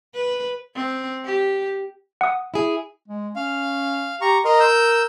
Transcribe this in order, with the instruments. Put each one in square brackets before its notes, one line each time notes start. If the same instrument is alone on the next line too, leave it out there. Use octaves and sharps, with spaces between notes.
[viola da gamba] B4
C4
G4
[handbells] F#5 D#6
[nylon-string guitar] E4 G#4
[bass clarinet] G#3
[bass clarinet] C#4 [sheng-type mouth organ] F5
[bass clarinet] G4 [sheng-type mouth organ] A#5 C#6
[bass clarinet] A#4 [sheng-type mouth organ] D#5 A#5 C6
[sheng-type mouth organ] E6 G6